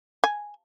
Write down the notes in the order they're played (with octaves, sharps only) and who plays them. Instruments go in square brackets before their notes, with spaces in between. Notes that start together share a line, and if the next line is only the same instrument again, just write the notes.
[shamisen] G#5